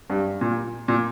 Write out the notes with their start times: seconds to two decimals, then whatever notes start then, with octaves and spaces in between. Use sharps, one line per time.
0.10 G2
0.41 A#2
0.88 A#2